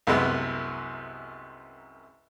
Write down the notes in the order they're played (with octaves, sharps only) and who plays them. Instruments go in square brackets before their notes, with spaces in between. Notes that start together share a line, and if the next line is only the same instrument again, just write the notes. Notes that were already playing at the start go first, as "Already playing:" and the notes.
[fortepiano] C2 F#2 C3 G#3 B3